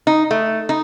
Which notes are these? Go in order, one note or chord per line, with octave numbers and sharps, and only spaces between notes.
D#4
A3
D#4